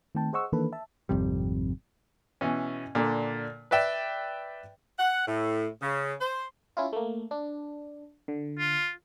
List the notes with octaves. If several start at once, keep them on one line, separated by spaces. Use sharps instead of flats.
D#3 A3 C4 G5 A5
G#4 C5 D#5 F#5 C#6 E6
D#3 E3 A#3 D4 A4 B4
E5 A5
G#1 F2 C3 G3
B2 E3 C#4
A#2 D3 D4
B4 D5 E5 G5
F#5
A2
C#3
C5
C#4 E4 F4
A3 A#3
D4
D3
F4